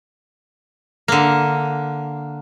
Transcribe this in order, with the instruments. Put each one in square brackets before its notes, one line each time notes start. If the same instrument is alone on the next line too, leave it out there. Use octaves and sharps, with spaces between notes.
[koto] D3 A#3